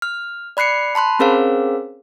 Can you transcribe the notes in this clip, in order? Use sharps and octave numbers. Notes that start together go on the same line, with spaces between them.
F6
D5 B5 F#6 C7 C#7
A5 B5 C6 F#6
C4 C#4 G#4 A#4 C5 F5